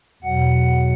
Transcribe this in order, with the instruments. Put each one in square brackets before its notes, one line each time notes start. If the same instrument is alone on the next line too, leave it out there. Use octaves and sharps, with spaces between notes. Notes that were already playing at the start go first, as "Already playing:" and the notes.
[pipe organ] E2 B2 F#3 F#5